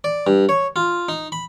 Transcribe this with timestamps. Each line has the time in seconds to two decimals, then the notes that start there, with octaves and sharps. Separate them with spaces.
0.04 D5
0.27 G2
0.49 C#5
0.76 F4
1.09 D#4
1.32 B5